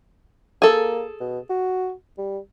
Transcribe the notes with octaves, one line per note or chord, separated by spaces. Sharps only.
A#3 G#4 A4
B2
F#4
G3